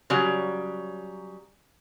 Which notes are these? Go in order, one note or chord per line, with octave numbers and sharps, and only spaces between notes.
C#3 F#3 G3